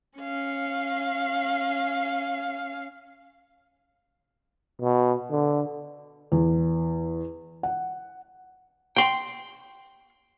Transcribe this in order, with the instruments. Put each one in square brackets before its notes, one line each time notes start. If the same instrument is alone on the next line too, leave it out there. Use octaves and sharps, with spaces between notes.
[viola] C#4 F5
[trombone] B2
D3
[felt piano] E2
F#5
[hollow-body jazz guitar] G5 C6